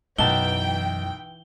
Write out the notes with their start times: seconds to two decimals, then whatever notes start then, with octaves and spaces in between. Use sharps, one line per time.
0.19 B1 F#2 E3 G5 A5 G7